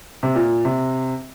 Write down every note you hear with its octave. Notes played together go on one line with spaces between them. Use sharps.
C3
A#2
C3